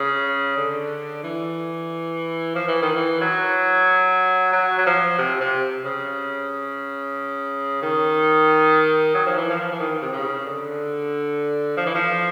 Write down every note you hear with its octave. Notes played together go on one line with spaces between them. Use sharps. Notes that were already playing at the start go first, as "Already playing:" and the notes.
Already playing: C#3
D3
E3
F3
E3
D#3
E3
F#3
F#3
F#3
F3
C3
C3
C#3
D#3
F#3
F3
E3
F3
E3
D#3
C3
C#3
D3
F3
E3
F3